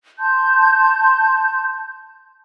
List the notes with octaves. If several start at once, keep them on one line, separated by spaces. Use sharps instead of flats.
A5 C6 G6